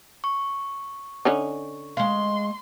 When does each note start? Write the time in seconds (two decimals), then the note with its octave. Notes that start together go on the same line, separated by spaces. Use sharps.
0.24 C#6
1.25 D3 C#4 D#4
1.97 G#3 F5 C6